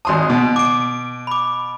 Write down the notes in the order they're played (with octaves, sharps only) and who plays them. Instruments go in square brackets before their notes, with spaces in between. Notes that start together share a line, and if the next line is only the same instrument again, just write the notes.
[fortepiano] G#1 C6 D#6 [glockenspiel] A5
[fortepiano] B2
[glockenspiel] D6 D7
B5 D6